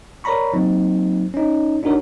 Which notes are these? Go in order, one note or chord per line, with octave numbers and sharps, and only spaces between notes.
A#4 C#5 D5 A#5 B5 C#6
F#3 A#3 C4 D#4
C#4 D#4
D4 D#4 F#4 A#4 C#5